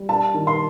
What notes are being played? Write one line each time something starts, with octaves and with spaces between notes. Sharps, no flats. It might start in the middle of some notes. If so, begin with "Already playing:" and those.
Already playing: G3
D4 A5
D#3
C6